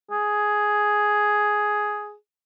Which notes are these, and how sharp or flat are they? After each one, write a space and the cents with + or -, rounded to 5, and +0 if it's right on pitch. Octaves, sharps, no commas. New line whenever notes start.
G#4 +5